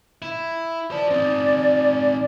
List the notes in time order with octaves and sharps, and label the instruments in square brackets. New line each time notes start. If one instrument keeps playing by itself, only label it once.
[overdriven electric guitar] E4
[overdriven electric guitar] C5 A5 [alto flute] D5
[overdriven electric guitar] C4 D#4